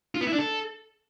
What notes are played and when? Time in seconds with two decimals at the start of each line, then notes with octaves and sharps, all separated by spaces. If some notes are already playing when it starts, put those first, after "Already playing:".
0.15 F4
0.21 B3
0.27 E4
0.33 D4
0.39 A4